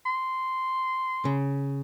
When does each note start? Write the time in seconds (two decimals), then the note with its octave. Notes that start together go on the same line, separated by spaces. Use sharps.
0.06 C6
1.25 C#3